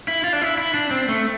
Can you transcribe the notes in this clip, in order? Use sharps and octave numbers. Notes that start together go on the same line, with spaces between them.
E4
F4
D4
E4
E4
D4
C4
A3